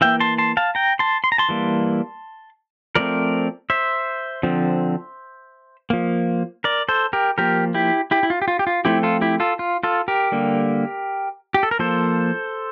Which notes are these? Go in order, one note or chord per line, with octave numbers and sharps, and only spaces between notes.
E3 A#3 E5 G5
A5 C6
A5 C6
F5 A5
G5 A#5
A5 C6
C6
A#5
A5 C6
E3 G3 A#3
F3 A3 C4 A#4 D5
C5 E5
D3 F3 C4
F3 A#3
A#4 D5
A4 C5
G4 A#4
F3 A#3 G4 A#4
E4 G4
E4 G4
E4
F4
G4
F4
G4
F4
F3 A3 C4 E4 G4
F4 A4
E4 G4
F4 A4
F4
F4 A4
G4 A#4
D3 G3 A#3
G4
A4
A#4
F3 A#3 A4 C5